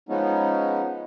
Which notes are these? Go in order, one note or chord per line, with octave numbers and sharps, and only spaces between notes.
F3 G#3 B3 C#4 D#4